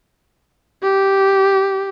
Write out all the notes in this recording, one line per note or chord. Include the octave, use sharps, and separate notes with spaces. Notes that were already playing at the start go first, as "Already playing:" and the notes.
G4